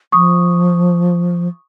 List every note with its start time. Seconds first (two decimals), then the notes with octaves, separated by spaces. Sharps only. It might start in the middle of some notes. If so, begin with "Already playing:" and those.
0.12 F3 C#6 D#6